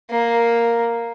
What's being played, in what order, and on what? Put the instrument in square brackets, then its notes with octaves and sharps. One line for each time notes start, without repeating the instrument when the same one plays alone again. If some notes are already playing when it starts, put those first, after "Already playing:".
[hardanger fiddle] A#3